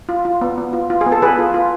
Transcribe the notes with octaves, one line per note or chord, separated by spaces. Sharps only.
F4
F4
B3
B3
F4
F4
G#4
B3
A4
B3 G#4 B4
F4
F4